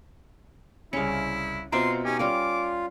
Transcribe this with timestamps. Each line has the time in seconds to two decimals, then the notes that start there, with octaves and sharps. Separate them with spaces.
0.93 C2 C#3 C#4 E4 F5 C#7
1.72 B2 C4 F4 E5 A#5 C6 D6
2.05 C#4 D#4 G4 G#5
2.19 G3 C#4 F4 A#4 F5 D6